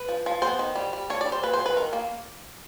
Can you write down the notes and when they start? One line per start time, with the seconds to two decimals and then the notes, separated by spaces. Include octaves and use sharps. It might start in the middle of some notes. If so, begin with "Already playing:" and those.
Already playing: B4
0.09 F3
0.26 F3
0.42 B3 C5
0.59 D#3
0.76 G3
0.93 G3
1.10 D4 C#5
1.21 D5
1.26 G3
1.32 C5
1.43 A#3 B4
1.54 C5
1.59 F#3
1.66 B4
1.76 D#3 A#4
1.93 A#3